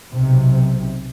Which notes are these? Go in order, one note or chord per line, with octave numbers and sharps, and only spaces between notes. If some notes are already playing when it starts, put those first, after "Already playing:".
B1 C3